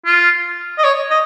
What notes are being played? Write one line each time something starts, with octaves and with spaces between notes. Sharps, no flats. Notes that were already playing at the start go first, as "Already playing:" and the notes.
F4
D#5
C#5
D#5